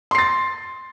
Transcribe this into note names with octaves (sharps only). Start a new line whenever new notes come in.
C6 A6 C7